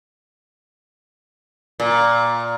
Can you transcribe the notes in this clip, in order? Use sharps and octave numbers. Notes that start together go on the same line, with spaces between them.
A#2